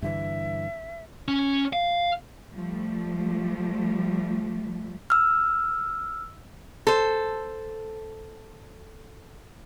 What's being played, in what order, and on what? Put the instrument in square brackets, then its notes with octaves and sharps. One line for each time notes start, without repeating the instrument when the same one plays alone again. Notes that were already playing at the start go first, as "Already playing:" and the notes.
[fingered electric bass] G2 D3 E3 [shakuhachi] E5
[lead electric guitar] C#4
F5
[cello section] F3 G3 A3
[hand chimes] E6 F6
[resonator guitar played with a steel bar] A4 C5